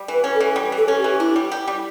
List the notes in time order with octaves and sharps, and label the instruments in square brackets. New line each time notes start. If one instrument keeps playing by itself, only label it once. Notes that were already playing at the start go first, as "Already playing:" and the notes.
Already playing: [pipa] G3
E3
[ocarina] B4
[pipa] C#4
[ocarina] A4
[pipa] E3
G3
E3
[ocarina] A4
[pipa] C#4
[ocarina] G4
[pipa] E3
[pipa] D4 [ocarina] E4
[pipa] G3
G4
G3